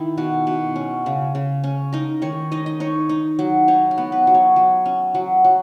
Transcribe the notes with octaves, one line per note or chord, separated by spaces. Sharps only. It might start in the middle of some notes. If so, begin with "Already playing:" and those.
Already playing: D#3 D#4 E4
B2 F#4
B2
C#4
C#3
C#3
C#4
D#4 A#4
D#3 C#5
D#4 D#5
D#5
D#4 C#5
D#4
F#3
D#4 C#5
A#4
B3
B4
F#3
C#5
F#3
C#4
F#3
F#3